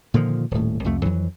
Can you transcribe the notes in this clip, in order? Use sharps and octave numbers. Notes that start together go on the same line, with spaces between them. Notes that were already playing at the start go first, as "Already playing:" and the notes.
A#2 D3 D#3 F3
D#1 A2
C2 F2 A3
F2 E3 F#3